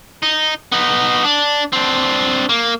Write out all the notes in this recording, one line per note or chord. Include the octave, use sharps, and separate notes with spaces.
D#4
B3 D#4
D4
C4 D4
A#3